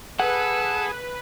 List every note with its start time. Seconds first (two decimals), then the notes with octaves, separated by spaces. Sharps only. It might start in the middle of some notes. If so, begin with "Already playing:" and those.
0.19 G#4 A4 B4 F#5